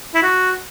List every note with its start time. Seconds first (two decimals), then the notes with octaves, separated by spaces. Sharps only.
0.15 E4
0.23 F#4